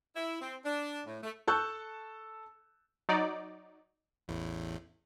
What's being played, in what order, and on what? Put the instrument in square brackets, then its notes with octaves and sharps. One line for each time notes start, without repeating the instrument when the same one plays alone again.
[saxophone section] E4
C4
D4
A2
A3
[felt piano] A4 A5 C#6 E6 F#6 G6
[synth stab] F#3 D#4 D5
[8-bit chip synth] A1 E2 A2